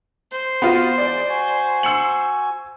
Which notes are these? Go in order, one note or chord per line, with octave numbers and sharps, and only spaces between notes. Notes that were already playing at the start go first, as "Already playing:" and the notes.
C5
B3 F4 F#4
E2 G#3 D5
F#4 G#5
E6 C#7 F#7